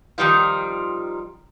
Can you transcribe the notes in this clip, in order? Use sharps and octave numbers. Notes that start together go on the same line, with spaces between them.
D#3 F3 G3 D#4 F4